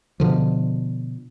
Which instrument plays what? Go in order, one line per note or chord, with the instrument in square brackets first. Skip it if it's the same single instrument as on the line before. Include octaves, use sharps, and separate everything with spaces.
[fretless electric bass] B2 D3 F3